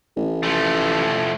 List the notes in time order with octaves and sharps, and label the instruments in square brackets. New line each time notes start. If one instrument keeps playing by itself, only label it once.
[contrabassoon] A1
[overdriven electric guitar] F3 A3